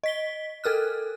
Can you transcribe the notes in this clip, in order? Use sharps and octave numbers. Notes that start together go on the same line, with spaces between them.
D#5 B6 G7
A4 A#4 F6 F#6